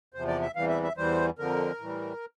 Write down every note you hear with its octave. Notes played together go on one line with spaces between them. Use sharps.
E2 C3 F3 C5
D5
E5
E2 C3 E3 G3 F5
E5
E5
E2 E3 G3 C5
F2 D3 F3 A#4
A2 E3 G3